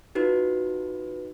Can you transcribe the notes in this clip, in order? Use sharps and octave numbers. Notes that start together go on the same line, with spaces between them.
D#4 F4 F#4 B4